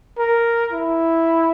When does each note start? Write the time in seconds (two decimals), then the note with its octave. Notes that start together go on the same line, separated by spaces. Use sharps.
0.18 A#4
0.72 E4